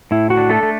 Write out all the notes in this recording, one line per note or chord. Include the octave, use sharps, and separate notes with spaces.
A2 E4
F#4
D4
A3 A4
A3